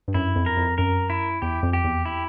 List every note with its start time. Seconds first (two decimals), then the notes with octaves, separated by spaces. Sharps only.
0.08 G2
0.14 F#2 E4
0.36 F2
0.46 A#4
0.57 F2
0.78 F#2 A#4
1.10 E4
1.42 E2 G4
1.63 F2
1.73 G4
1.84 E2
2.05 E4